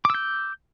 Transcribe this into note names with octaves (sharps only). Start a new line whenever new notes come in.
D6 E6 G6